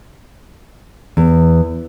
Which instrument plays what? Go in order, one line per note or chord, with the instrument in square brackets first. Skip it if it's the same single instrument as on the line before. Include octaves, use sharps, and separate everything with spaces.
[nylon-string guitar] E2